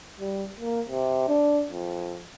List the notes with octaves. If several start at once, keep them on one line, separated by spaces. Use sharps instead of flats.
G3
A#3
C3
D4
F2